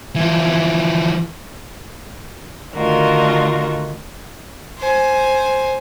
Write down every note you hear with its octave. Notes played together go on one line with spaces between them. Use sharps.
E3 F3
D3 D#3 A3 F4 F#4 A#4
C5 G#5